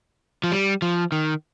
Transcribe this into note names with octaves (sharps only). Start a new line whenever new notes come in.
F3
G3
F3
D#3